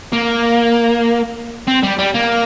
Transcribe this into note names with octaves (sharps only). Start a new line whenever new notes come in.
A#3
C4
G3
G3
A#3